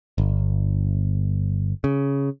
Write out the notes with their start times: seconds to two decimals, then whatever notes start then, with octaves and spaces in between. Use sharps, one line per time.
0.18 G1
1.84 C#3